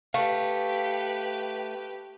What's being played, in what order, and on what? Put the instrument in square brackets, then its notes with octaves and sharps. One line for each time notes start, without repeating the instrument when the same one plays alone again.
[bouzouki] A3 [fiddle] G4 B4 [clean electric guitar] F5